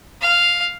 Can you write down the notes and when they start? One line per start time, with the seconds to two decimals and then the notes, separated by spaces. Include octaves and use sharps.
0.22 F5